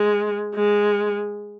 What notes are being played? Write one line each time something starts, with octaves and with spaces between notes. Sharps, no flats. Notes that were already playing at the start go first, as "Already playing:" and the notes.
Already playing: G#3
G#3